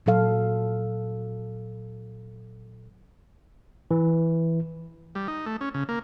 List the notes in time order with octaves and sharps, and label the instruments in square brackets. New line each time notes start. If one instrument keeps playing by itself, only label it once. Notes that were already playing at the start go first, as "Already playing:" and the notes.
[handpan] A#2 F#3 A4 F5
[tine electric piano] E3
[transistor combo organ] G3
D#4
A3
C#4
C#3
A#3